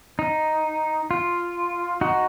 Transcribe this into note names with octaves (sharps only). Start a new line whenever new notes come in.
D#4
F4
D#4 F#4